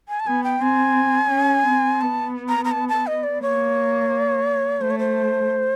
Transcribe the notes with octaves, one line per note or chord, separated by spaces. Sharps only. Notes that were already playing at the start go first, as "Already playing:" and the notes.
G#5
A5
B3 G#5
G5
C4 G#5
C#4
C4
B3 A5
A#5
A#5
A5
A5
D#5
D5
A#3 C#5
A3 C5
C#5
C5